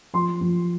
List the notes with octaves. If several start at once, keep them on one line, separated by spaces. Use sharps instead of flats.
F3 C6
F3